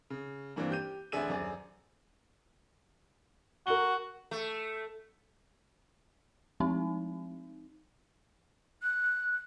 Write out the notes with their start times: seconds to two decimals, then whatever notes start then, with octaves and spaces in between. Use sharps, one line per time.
0.10 C#3
0.56 G2 E3 A#3 C4 D4
0.70 G4 G6 D#7
1.12 A1 D2 D4 G#4 E5 D#7
1.29 D#1 F#2 G#4 D5
3.67 F#4 A#4 G7
4.31 A3
6.60 F3 G#3 C4 D#4
8.83 F#6